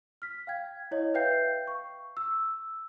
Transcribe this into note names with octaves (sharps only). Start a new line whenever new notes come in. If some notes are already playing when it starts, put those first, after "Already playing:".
F6 B6
F5 G5 G#6
E4 C#5 D#5
B4 E5 F5 G5 G6 C7
C#6
E6